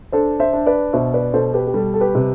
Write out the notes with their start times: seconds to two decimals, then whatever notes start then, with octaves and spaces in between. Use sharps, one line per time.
0.12 D4 A4 C5
0.40 C5 E5
0.53 D4
0.66 B4 D5
0.93 B2 C5 E5
1.14 B4 D5
1.34 B2 A4 C5
1.54 G4 B4
1.67 G4
1.74 G3 A4
1.94 A4
2.01 G4 B4
2.15 C3